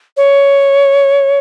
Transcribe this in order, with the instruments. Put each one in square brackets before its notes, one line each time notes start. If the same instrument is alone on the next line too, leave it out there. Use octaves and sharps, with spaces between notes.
[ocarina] C#5